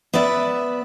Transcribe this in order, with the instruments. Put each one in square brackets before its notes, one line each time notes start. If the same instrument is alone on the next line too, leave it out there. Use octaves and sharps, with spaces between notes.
[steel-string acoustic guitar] B3 B4 D5 E5